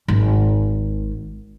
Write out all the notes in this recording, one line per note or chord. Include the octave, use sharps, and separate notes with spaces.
G#1